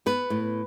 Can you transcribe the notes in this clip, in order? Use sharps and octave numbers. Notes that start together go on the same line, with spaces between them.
B3 B4
A2